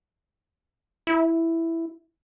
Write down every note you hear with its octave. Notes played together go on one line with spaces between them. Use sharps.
E4